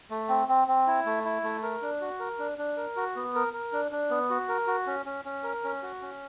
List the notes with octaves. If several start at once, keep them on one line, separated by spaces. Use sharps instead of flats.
A3
C4
C4
C4
E4
A3
E4
A3
A#4
D4
F#4
A#4
D4
D4
A#4
F#4
B3
A#4
A#4
D4
D4
B3
F#4
A#4
F#4
C#4
C#4
C#4
A#4
C#4
F#4
C#4